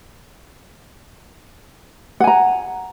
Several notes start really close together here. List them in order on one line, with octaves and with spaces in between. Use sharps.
F#5 G#5 A#5